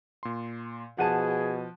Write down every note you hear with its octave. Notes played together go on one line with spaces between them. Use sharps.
A#2 C6
B2 F3 G#4 F#5 A5 D#7